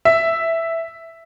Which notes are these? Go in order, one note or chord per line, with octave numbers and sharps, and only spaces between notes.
E5